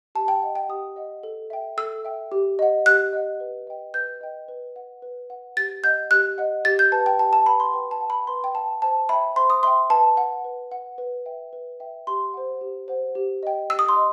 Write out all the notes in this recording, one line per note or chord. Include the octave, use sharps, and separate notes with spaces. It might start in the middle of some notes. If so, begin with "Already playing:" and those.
G4 A5
G5
D#5 F#5
G5
G4 D#6
D#5 F#5
A4
E5 G5
A4 E6
E5 G5
G4
D#5 F#5
G4 F#6
D#5 F#5
B4
D#5 G5
B4 G6
D#5 G5
B4
F#5
B4
F#5
G4 A6
D#5 F#5 G6
G4 F#6
D#5 F#5
G4 A6
G6
B4 F#5 A5
G5
G4 A5
A5
B4 F#5 B5
C6
B4 G5
A5
F#5
B5
B4 C6
G5
F#5 A5
C5 A5
E5 G5 B5
C5 C6
D#6
E5 G5 C6
B4 A5
F#5
B4
F#5
B4
E5 G5
B4
E5 G5
G4 C6
C5 F#5
G4
C5 F#5
G4
D#5 G5
G4 E6
D#6
C6
D#5